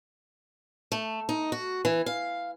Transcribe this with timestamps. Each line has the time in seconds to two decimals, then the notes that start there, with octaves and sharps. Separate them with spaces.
0.92 A3
1.29 D#4
1.52 F#4
1.85 E3
2.06 F5